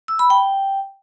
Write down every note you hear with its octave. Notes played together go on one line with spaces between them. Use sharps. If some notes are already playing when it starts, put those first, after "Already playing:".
E6
B5
G5